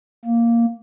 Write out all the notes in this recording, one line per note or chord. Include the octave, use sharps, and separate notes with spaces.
A#3